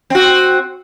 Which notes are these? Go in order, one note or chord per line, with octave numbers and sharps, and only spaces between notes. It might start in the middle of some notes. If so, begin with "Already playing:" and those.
C4 F#4